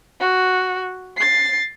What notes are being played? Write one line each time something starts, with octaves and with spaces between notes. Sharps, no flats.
F#4
A6 C7